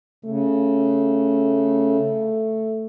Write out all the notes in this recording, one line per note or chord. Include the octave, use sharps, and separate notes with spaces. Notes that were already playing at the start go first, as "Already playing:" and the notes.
C#3 A3